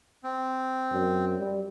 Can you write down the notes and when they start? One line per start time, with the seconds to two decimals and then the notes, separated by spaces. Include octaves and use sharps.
0.24 C4
0.92 F#2
1.38 G3